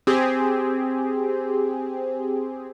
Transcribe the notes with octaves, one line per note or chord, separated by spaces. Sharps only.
C4 G4 G#4